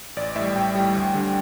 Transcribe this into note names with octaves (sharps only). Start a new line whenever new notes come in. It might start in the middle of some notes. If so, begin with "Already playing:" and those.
A1 D5
A2 E5
G3
A1 G5
A2 G3
D2
D3 G3